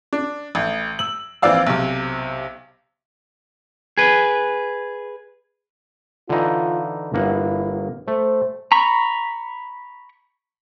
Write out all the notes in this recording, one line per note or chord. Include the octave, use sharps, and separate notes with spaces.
D4
A1
E6 F#7
A#1 E3 C4 D5 F5 E6
B1 C3
G#4 B4
D3 E3 D#4 F4
G1 A#3 E4 F#5
A3 C5
A#5 B5 C#6